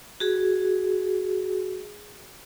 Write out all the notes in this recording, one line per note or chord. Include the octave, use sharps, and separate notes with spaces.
F#4 G#4